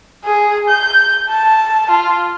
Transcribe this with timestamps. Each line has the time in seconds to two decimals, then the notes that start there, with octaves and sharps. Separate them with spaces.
0.25 G#4
0.68 G6
1.29 A5
1.90 F4